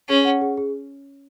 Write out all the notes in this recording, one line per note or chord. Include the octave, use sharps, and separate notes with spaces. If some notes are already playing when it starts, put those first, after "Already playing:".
C#4 G#4
F#5
G#4
G#4